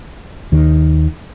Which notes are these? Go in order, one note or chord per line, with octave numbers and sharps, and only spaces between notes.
D#2 D#3